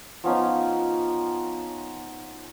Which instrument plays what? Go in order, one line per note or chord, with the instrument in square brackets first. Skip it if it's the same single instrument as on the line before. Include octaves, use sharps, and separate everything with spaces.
[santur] F3 B3 C#4 D#4